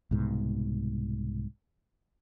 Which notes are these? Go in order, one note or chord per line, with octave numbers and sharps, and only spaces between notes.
C2 G#2 B2